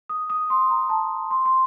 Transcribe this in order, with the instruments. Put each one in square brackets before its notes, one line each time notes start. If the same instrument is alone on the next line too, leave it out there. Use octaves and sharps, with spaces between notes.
[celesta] D#6
D#6
C6
A#5
A5
C6
C6